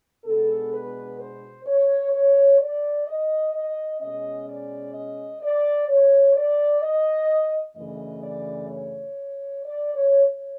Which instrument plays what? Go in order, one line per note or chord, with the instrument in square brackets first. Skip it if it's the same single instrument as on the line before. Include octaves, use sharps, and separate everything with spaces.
[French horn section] B2 G#3 B3 D4 A4
B4
C5
C#5
C#5
D5
D#5
D#5
B2 G#3 C#4 D#5
D5
D#5
D5
C#5
D5
D#5
F#2 C#3 E3 A3 D4 D#5
D5
C#5
D5
C#5
C#5